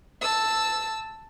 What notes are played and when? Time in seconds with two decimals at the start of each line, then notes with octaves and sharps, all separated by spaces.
0.22 A5 E6